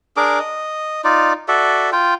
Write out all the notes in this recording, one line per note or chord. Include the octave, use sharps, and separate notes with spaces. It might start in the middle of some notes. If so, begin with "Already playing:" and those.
D4 G#4 A#4 D6
D#5
D#4 F4 D5
F#4 A4 D5 E5
F4 G5